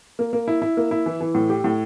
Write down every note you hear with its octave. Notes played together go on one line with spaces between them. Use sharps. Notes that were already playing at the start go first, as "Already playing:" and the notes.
A#3
A#3
E4
E4
A#3
E4
E3
E3
A2
G4
A2